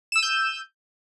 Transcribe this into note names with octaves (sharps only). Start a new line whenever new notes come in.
E6 G6 D#7 E7